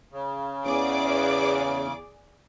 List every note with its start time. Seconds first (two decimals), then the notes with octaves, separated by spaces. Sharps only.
0.13 C#3
0.66 E2 C#4 G#4 D5 D6